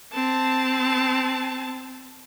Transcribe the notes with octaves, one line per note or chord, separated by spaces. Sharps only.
C4 A5